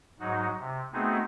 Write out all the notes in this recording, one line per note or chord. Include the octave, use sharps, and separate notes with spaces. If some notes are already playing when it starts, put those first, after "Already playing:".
G#2 F#3 D#4 F#4
C3
A3 B3 C4 D#4 F#4 G#4